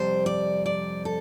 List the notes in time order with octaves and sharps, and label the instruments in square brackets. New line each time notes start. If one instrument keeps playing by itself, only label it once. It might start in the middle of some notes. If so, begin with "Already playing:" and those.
Already playing: [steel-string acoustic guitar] F2 C3 G3 C5
D5
D5
A4